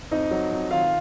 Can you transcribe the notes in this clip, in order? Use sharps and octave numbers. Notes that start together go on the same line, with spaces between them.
F2 D#4 D#5
F#3
F2
D#3 F4 F5